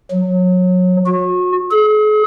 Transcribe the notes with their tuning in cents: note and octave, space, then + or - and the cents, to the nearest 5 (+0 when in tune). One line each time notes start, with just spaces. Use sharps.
F#3 -25
F#4 -35
G#4 +45